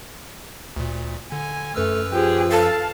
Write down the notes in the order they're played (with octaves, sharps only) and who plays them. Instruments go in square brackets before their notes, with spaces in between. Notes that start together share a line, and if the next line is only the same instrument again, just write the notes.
[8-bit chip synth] D2 A#2
[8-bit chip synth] D3 [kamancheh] G#5
[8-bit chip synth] F#2 B4 E6 [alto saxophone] A3 [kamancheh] F6
[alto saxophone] F3 [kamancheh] G4 G#4
[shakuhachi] A4 [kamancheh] F5 A5